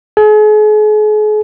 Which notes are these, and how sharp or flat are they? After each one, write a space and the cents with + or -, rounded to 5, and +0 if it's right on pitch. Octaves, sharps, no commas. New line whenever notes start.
G#4 +40